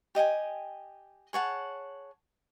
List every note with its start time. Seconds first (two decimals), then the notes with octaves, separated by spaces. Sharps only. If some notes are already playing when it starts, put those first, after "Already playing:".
0.15 G4 D#5 G5 G#5
1.33 G#4 C#5 F#5 A5